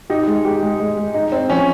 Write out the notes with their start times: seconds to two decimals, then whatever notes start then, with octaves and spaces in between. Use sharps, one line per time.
0.10 D#4 G4
0.27 G#3
0.45 G4
0.63 G#3
0.80 G#3
0.97 G#3
1.14 D#4
1.32 C4 D#4
1.50 F3 C#4